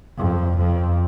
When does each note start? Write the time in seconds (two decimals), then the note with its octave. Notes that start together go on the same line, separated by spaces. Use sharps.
0.18 F2
0.58 F2